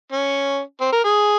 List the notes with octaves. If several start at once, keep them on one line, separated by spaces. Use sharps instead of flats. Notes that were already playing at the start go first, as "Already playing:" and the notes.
C#4
C4
A#4
G#4